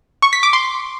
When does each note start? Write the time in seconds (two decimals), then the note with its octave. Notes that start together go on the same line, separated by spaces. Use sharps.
0.22 C#6
0.33 B6
0.43 D6
0.53 C6